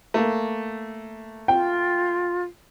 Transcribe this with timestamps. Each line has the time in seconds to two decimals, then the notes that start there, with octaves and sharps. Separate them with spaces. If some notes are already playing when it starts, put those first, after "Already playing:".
0.14 A3 A#3
1.48 F4 G5